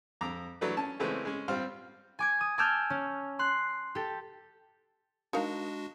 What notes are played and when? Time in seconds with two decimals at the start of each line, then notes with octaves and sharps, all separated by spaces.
0.21 F2 A#5 D6
0.61 E3 F#3 A3 D4 B4
0.77 C#4 A5
1.00 C#3 E3 G#3 A3 C4 C#4
1.25 G#3 C#4
1.48 G3 C4 F4 C5 F6
2.19 G#5 D6 G#6
2.41 D#6
2.58 G#5 A5 D6 E6 F6 G6
2.90 C#4
3.39 C6 F#6
3.95 G4 A4
5.33 G#3 D4 D#4 F#4 A#4 F5